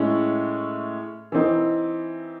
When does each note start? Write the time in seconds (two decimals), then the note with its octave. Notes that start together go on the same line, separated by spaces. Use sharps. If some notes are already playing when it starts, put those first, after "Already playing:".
Already playing: A2 G#3 C#4 E4
1.32 E3 C4 D#4